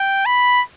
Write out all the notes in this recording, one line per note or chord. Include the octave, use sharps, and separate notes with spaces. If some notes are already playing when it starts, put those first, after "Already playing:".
Already playing: G5
B5